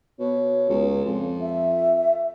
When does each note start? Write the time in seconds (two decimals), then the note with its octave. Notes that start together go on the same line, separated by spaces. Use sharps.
0.20 B2 C#5
0.70 C#2
1.06 F2
1.41 E5